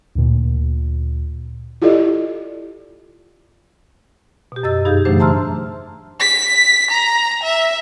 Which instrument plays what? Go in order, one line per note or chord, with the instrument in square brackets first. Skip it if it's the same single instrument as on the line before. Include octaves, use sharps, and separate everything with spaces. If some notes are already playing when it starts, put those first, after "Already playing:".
[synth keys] D2 A#2
[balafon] E4 F4 G4 A4 D5 D#5
[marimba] B2 G4
F#2 D#5 E6 A6
G2 D#4 G4 G#4 F5 G6
C#3 E3 F#3 A3 D4 C5
E5 A5 A#5 C6 E6 F6
[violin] B6
A#5
E5